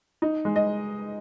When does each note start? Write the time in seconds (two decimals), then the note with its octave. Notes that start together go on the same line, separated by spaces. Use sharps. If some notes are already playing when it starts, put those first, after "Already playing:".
0.22 D#4
0.45 G#3
0.56 D#5